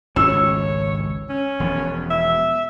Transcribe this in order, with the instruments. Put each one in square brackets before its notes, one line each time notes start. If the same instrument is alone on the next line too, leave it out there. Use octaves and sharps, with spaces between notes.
[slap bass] G#1 C#2 C#4 [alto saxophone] C#5 [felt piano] E6
[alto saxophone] C#4
[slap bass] E1 F3 B3
[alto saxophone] E5